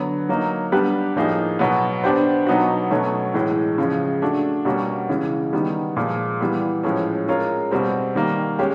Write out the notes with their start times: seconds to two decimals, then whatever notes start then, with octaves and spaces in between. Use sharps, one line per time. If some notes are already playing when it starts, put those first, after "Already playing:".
Already playing: D3 F#3 B3
0.29 F#3 A#3 D#4
0.72 G3 B3 D4 G4 B4
1.16 A2 F3 A#3 D#4 G#4
1.59 B2 F#3 B3
2.04 B3 D4 G4 C5
2.47 B2 F#3 B3 D#4 F#4
2.91 B2 F#3 A3 C#4
3.34 A2 E3 G#3
3.78 C#3 F3 G#3
4.22 A3 D4 F#4
4.65 B2 G3 A#3 C#4 F#4
5.09 C#3 E3 G#3
5.53 D#3 G3 B3 D#4
5.97 A#2 F3 G#3
6.41 E3 G3 B3
6.83 A2 F3 G#3 C#4
7.28 G#3 C#4 F4 A#4 C#5
7.71 B2 G3 C4
8.15 D#3 G3 A#3
8.59 G#3 C#4 G4